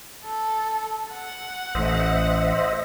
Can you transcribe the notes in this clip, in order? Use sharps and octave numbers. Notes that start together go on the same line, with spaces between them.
A4
F#5
A1 C5 D#5 E5